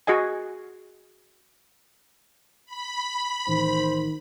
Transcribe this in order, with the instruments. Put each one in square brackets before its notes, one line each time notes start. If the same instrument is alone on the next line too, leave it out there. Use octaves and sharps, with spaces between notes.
[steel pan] F#4 G#4 D#5 G#5
[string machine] B5
[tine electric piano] A1 [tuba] D#3 [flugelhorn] C5